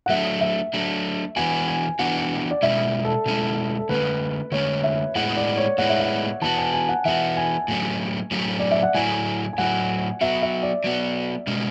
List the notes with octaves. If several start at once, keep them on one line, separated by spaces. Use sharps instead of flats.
F#5
F#3 A3 D4 E5
E5
F#3 A3 D4
E3 B3 D4 F#4 G#5
G#5
E3 B3 D4 F#4 F#5
D5
B2 G#3 C#4 E4 E5
A4
B2 G#3 C#4 E4
A4
D3 A3 C#4 B4
D3 A3 C#4 C#5
E5
A2 G#3 B3 E4 F#5
D5
C#5
A2 G#3 B3 E4 F#5
E5
F#5
E3 B3 F#4 A5
G#5
G#5
F#5
E3 B3 F#4 E5
G#5
A2 F#3 A3 C#4
A2 F#3 A3 C#4
D5
E5
F#5
A2 F#3 A3 E4 G#5
G#5
A2 F#3 A3 E4 F#5
F#3 B3 F#4 E5
E5
D5
F#3 B3 F#4
B2 G#3 C#4